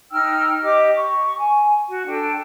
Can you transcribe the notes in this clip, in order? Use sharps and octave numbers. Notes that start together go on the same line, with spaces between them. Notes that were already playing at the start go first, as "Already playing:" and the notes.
D#4 G5 E6 F6
G4 D#5 D6
C#6
G#5
F#4
D4 A4 G5